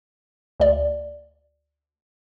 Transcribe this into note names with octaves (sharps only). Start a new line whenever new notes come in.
D2 D5